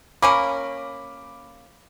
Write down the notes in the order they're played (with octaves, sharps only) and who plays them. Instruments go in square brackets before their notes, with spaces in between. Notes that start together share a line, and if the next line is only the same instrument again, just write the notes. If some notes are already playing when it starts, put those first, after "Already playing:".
[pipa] A#3 C#4 A#4 [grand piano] B5 D6